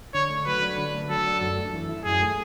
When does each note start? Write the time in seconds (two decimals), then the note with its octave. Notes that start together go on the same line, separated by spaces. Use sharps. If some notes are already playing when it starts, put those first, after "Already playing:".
0.14 D3 C#5
0.30 A3
0.46 F#3 B4
0.62 D4
0.78 D3
0.94 A3
1.09 F#3 A4
1.26 D4
1.41 F#2
1.57 A3
1.74 E3
1.89 E4
2.05 F#2 G#4
2.21 A3